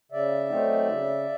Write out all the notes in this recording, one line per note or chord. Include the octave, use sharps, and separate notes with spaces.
C#3 D5 E5
F#3 A3 C4 D#4
C#3